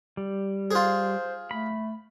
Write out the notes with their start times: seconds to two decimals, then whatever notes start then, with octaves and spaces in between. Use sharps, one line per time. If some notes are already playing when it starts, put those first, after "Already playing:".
0.17 G3
0.71 F4 G#4 C5
1.51 A3 B5